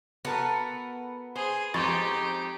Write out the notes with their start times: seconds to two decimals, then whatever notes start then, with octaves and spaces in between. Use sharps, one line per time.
0.25 B3 F#4 A4 A#4
1.36 G#4 C5
1.74 F2 G#3 D#4 G4 C#6 A6